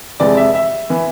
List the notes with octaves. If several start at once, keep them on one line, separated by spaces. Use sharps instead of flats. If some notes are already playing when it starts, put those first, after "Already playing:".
F2 C3 E3 G#3 D5
E5
E5
E3 B3